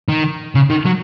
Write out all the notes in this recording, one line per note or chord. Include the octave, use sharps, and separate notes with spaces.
D#3
C#3
D#3
F#3